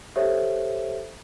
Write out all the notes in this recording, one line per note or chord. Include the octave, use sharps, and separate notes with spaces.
G4 A4 C5 C#5 E5